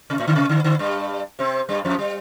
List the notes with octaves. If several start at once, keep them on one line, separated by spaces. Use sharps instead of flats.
C3
A2
D3
C3
D3
D3
G2 G3
C3 C4
G2 G3
F2 F3
G3